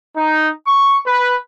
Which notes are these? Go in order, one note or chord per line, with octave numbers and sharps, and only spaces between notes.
D#4
C#6
B4